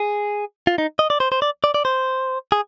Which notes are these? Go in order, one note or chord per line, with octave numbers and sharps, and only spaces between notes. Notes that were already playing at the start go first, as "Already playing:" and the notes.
Already playing: G#4
F4
D#4
D#5
D5
C5
C5
D5
D5
D5
C5
G#4